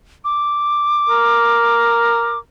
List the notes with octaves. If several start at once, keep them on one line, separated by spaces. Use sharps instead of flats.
D6
A#4